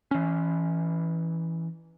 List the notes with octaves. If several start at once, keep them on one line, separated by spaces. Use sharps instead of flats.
E3 C#4